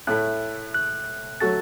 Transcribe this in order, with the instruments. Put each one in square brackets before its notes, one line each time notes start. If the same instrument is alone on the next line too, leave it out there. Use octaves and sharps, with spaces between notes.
[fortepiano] A2 A3 E4 A4 [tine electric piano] F#6
[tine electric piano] F#6
[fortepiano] F#3 A3 F#4 A4 [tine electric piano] A6